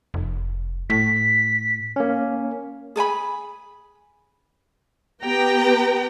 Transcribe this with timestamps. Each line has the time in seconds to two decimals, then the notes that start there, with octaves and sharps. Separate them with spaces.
0.14 F1
0.90 A2 B6
1.96 A#3 C#4
2.96 G#4 A4 G#5 B5
5.23 B3 G4 B4 G5 A#5